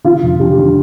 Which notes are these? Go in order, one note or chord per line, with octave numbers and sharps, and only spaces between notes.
D3 F4
F1
D3 G4
D3